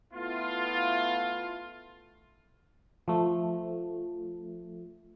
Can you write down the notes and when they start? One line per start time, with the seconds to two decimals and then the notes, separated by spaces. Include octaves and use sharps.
0.13 A3 B3 E4 F4
3.08 F3 A3